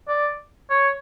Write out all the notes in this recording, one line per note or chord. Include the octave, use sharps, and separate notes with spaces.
D5
C#5